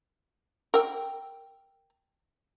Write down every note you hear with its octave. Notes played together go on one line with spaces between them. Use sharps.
A#4 G5